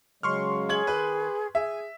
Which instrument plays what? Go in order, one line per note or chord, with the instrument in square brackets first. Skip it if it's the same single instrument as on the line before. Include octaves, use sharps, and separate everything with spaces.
[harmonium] C#3 F#3 G#3 [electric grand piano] C6 C#6 F6
[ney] G#4 [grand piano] C#5 G#6 F#7
[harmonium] D#3 [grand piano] B4
[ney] G#4 [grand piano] E5 [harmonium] G#5